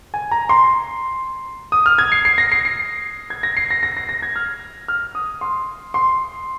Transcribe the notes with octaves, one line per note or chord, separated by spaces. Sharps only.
G#5
A#5
C6
D#6
F6
G#6
C7
C7
A#6
C7
C7
G#6
A#6
C7
A#6
A#6
A#6
A#6
G#6
F6
F6
D#6
C6
C6